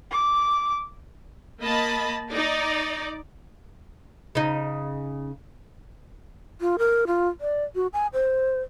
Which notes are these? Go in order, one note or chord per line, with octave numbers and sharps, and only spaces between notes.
D6
A#3 D#5 A5 B5
D#4 D5
C#3 D#4
F4
A#4
F4
D5
F#4
G#5
C5